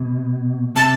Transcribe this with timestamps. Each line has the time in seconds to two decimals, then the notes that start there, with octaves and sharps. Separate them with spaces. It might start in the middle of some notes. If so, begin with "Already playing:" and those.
Already playing: B2
0.76 C3 A5